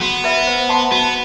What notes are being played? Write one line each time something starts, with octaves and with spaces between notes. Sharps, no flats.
B3 F#4
B4 E5 B5
C5
F#5 A5 C6
B3 F#4